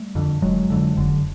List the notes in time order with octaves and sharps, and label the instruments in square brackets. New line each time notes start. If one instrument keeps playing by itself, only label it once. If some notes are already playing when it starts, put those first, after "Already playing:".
Already playing: [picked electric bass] G3 A3
F2 D3
F1 F#3 G#3
F2 D3
F1 D3